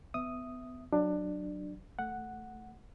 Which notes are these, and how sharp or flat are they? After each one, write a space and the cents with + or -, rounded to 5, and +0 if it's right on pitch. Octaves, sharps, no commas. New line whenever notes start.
B3 +25 E5 +0 D#6 +0
F#3 +5 D4 +20
A3 +0 F#5 +0